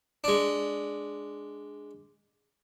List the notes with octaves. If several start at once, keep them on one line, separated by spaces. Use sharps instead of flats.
G#3 D4